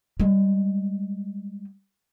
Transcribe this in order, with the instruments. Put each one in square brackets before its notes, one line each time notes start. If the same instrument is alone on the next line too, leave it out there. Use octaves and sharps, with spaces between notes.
[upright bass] G3 G#3